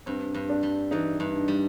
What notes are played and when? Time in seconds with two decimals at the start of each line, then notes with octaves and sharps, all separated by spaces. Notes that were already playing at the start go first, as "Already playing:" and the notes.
0.06 G2 C4
0.34 G2
0.49 D4
0.63 G3
0.91 E3 D#4
1.20 G2
1.48 G3